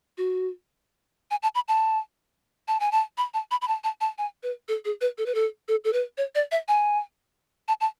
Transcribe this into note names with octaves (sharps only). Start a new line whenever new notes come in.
F#4
G#5
A5
B5
A5
A5
G#5
A5
B5
A5
B5
B5
A5
A5
A5
G#5
B4
A4
G#4
B4
A4
B4
A4
A4
A4
B4
C#5
D5
E5
G#5
A5
A5